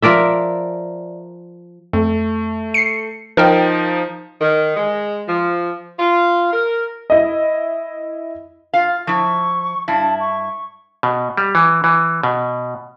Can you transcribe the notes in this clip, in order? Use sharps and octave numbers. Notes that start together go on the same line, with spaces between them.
F3 A#4 D5 E5
F2 A3
C7 C#7
F3 D#4 A#4 G5
D#3
G#3
F3
F4
A#4
E4 D#5
F4 F5
F3 E4 C#6
G2 E4 A5
C#6
B2
G3
E3
E3
B2